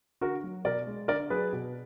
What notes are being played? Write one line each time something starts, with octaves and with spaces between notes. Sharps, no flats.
D3 F#4 A#4
F#3
B2 A#4 D5
G#3
D3 A#4 D5
F#3 G#4 B4
B2